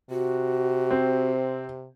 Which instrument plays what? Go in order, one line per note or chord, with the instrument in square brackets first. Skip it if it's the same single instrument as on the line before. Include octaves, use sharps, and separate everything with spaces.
[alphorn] C3 [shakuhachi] F#4
[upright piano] C4